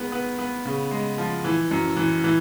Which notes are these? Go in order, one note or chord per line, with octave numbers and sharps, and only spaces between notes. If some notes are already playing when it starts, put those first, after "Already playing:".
Already playing: D#3 G#3 B3
B3
B3
C#3
G#3
F3
E3
F#2
E3
E3